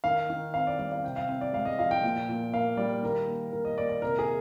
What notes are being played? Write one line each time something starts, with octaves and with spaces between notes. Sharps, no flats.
D#3 F5
D#3
C4 F5
D5
G3 D5
F5
C3 G5
F5
C4
D5
G#3 F5
D#5
F3 F5
G5
A#2
A#2
A#3 F5
G3 D5
D#3 A#4
A#3
D#3 A#4
D#5
A#3 D5
D5
C3 A#4
G#4